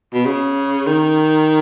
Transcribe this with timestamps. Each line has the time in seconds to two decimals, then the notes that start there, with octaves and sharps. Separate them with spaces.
0.14 B2
0.26 C#3
0.87 D#3